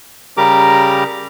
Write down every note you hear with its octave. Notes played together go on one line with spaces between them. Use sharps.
C#3 G3 G4 A#4 A#5 D6